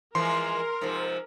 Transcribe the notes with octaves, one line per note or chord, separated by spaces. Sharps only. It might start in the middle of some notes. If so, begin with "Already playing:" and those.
E3 F3 G#3 A#4 C6
G#2 C3 F3